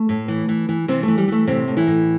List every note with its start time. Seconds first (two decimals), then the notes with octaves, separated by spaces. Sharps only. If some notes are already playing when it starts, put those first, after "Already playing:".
Already playing: A3
0.09 A2
0.28 E3
0.49 E3
0.69 E3
0.88 C3 E3 C4
1.03 E3 A3
1.18 G3
1.28 E3 A3
1.47 A2 C3 C4
1.67 A2
1.77 E3 E4
1.87 A2